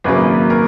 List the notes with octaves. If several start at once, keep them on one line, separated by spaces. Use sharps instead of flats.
G#1 F#2 C#3 F#3 A#3 B4
A#4